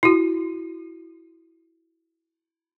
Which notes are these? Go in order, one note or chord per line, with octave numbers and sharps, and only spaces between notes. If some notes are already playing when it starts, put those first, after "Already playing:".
E4 F#4